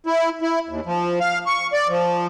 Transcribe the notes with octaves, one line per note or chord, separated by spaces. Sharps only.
E4
E4
D#2
F3
F5
C#6
D5
F3